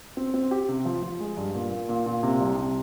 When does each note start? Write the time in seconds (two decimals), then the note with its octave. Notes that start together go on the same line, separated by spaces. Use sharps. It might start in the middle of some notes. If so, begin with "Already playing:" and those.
0.17 C4
0.34 C4
0.51 G4
0.69 C3
0.85 F3
1.03 F3
1.20 G#3
1.37 G2
1.55 A#2
1.71 A#2
1.89 A#2
2.06 A#2
2.23 C3
2.41 C2
2.57 C3